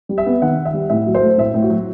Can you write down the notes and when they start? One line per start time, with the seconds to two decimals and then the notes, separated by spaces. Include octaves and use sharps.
0.09 G3
0.18 E5
0.26 B3
0.42 D#3 F#5
0.58 D#3
0.65 E5
0.74 G3
0.89 A2 E5
1.06 F#3
1.15 C5
1.22 A3
1.38 A2 E5
1.54 A2
1.62 F#4
1.70 F#3